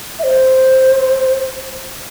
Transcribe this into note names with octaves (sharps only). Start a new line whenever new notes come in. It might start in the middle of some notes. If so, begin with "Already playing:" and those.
E5
C5